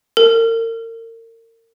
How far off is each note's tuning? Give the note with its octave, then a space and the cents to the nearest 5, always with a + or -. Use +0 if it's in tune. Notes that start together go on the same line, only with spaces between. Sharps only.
A#4 -35